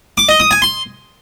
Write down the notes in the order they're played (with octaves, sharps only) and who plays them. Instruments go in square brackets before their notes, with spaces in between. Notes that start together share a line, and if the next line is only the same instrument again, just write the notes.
[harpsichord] D6
D#5
D#6
G#5
C6